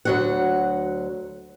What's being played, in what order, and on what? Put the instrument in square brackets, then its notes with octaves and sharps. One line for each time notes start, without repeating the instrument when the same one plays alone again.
[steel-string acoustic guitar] D2 F#3 F#5